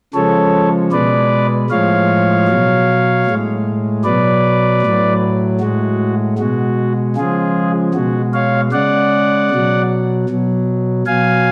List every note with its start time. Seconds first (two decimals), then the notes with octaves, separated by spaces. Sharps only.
0.14 C#3 F3 G#3 A4 C#5
0.92 B2 G#3 B4 D5
1.70 A2 F3 G#3 C#5 F5
2.48 B2 F#3
3.26 A2 G#3
4.04 B2 F#3 B4 D5
4.82 A2 F#3
5.60 A2 G#3 F#4
6.38 B2 G#3 F#4
7.16 C#3 F3 G#3 F4 G#4
7.94 B2 G#3 F#4
8.33 C#5 F5
8.72 C#3 G#3 D5 F#5
9.50 B2 F#3
10.29 B2 F#3
11.06 B2 F#3 F5 G#5